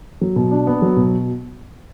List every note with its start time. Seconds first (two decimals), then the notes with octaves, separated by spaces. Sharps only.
0.21 F#3
0.36 B2
0.51 D4
0.67 B3
0.82 F#3
0.97 B2